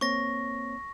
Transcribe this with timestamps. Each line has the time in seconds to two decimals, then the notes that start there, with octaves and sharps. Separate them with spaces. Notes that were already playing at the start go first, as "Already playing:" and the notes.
0.01 A#3 C4 C#5 C#6 A#6